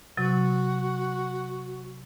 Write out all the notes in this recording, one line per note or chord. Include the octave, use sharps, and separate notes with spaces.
C3 F#3 F#4